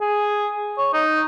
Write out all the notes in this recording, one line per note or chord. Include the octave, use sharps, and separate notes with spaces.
G#4
C#5
D#4